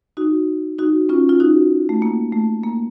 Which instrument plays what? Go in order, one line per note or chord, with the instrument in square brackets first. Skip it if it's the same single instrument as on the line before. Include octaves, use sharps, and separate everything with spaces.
[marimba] D#4 F#4
D#4 F#4
C#4 F4
F4
D#4 F#4
A3
A#3
A3
A#3